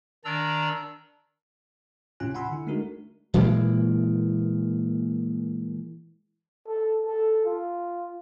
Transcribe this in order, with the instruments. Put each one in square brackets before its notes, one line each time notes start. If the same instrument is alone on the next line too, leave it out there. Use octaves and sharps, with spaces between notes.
[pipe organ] D#3 D4 D5 A#5 E6
[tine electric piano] A2 C3 C#4 F4 G#5 F#6
F#5 G#5 B5 C6 E6
D3 E4
G#3 A3 D4 D#4 F#4 A#4
[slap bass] A#2 E3 G#3 A#3
[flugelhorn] A4
A4
F4